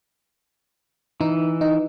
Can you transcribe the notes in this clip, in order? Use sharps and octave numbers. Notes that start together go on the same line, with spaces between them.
E3 D#4
D#4